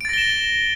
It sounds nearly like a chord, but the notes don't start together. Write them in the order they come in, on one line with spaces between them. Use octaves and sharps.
D7 A6 A#6 G7 E7